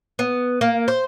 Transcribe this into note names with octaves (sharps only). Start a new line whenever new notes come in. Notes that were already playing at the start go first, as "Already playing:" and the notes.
B3
A#3
C5